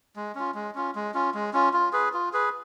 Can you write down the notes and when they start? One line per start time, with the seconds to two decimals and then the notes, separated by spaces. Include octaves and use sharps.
0.16 G#3
0.35 C#4 F4
0.55 G#3
0.75 C#4 F4
0.95 G#3
1.14 C#4 F4
1.34 G#3
1.53 C#4 F4
1.73 F4
1.93 G#4 B4
2.13 F4
2.33 G#4 B4